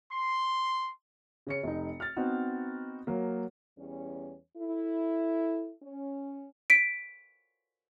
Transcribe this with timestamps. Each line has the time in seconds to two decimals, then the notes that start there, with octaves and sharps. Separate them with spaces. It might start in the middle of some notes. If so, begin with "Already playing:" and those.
0.13 C6
1.47 C#3 C#4 C#7
1.63 F1 D#4
2.00 F6 A6
2.16 B3 C4 D#4 F#4
3.07 F#3 A#3
3.77 E2 G3 C#4
4.56 E4 A4
5.82 C#4
6.70 B6 D7